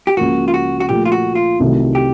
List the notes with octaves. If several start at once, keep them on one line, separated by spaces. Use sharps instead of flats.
G4
C#2 C#3 F3 A#3 F#4
F4
F#4
F#4
A#2 F3 A3 G4
F4
F#4
F4
C2 C3 D#3 F#3 A3
G4